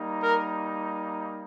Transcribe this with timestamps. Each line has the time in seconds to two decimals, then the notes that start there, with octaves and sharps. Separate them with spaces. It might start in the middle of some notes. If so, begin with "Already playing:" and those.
Already playing: G3 A#3 D#4
0.20 A#4